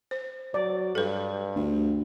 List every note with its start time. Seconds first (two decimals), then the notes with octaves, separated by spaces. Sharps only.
0.11 C5
0.54 F#3 D5
0.95 G2 A4 B4
1.56 D2